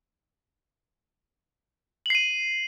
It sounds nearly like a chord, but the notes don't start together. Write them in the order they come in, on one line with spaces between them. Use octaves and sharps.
F#7 C7 D#7